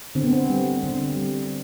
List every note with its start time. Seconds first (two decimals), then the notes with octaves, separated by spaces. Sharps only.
0.15 D3 C4
0.24 B3
0.33 C4
0.49 G3
0.83 D3 C4
1.16 G3